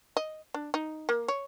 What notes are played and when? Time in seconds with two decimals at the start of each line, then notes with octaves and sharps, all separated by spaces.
0.17 D#5
0.54 D4
0.74 D#4
1.09 A#3
1.28 C#5